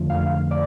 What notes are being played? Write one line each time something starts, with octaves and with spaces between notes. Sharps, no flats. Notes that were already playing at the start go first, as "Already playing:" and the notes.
Already playing: F2 D3 F3 A3
F5
D5